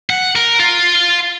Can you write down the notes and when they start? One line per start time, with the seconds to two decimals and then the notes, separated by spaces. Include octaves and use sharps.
0.10 F#5
0.36 A#4
0.59 F4